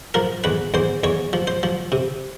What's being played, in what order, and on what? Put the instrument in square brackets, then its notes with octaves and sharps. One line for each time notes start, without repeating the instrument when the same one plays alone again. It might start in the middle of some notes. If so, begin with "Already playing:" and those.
[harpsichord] F3 A#4
E2 B4
E2 C5
E2 C#5
F3
C5
F3
C3